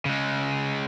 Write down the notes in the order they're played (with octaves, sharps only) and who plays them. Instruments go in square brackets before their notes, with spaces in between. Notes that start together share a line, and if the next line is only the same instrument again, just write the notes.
[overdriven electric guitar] C#3 G#3